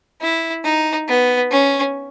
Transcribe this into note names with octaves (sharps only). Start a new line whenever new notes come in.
E4
D#4
B3
C#4